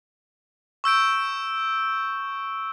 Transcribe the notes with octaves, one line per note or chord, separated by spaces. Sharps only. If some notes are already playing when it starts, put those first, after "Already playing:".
C#6 E6 G6 D7